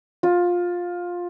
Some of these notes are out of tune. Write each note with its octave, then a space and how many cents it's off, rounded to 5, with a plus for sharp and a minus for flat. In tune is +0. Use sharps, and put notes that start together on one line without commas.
F4 +15